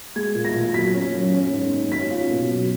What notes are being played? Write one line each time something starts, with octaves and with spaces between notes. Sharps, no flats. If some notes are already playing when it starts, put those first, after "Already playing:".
G#3 G#6
A#2
A#6
A#2
F#3 B6
C#4
F#2
C#4
G#2
G#2
C#4 B6
F4
B2
F#3